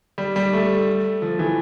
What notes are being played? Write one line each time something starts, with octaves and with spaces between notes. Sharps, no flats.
G3
G3
A3
F3
E3